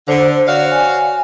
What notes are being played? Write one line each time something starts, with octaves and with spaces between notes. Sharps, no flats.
D3 C5
F#4 C#5 D5 F5
G#5